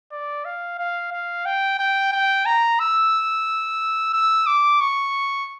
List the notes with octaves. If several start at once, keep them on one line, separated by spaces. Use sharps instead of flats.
D5
F5
F5
F5
G5
G5
G5
A#5
E6
E6
D6
C#6